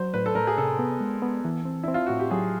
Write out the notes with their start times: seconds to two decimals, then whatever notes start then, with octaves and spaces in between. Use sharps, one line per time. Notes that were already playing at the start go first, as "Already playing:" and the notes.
Already playing: F#3 C5
0.14 A2 B4
0.26 A4
0.35 A2 A#4
0.47 G#4
0.57 C3 A4
0.79 B3
1.00 G#3
1.22 B3
1.45 E3
1.65 C4
1.83 C4 E4
1.94 F4
2.06 A2 F#4
2.19 G4
2.31 F#3 G#4